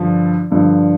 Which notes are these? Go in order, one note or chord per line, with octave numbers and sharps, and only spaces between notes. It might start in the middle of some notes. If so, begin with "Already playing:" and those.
Already playing: G2 D3 F3
G2 D3 F3